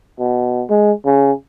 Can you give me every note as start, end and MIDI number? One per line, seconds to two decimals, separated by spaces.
0.19 0.64 47
0.69 0.92 56
1.05 1.31 49